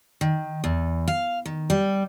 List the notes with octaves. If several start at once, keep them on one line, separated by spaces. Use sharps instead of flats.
D#3
E2
F5
D#3
G3